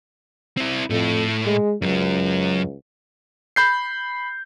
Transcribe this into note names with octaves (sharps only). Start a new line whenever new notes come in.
C4 E4
F2 A2 A3
G#3
C#2 F#2 F#3
B5 G6 C7